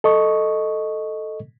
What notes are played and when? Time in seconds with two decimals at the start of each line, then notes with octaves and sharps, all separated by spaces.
0.04 A4 D#5 C#6